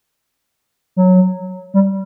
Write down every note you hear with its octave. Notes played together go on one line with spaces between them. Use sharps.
F#3
G3